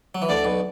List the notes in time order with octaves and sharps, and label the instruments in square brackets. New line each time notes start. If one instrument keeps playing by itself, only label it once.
[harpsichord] F#3
E3
[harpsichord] D2 D3 [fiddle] D5
[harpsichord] B1 B2